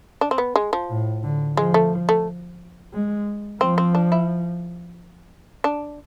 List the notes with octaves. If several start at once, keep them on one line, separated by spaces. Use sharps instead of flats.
D4
C4
B3
G#3
F3
A2
D3
F3 G#3
A3
A3
G#3
F3 C4
C4
D4
E4
D4